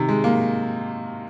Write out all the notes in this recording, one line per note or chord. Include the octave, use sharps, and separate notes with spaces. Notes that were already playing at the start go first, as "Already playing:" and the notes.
Already playing: C3 D#3
G#3
A#3